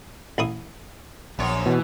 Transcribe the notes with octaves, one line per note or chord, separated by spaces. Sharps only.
A1 E4 D#6
A#1 F#2 C#5
B2 E3